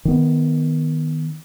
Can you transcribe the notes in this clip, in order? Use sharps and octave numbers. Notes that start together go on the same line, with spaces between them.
D#3 B3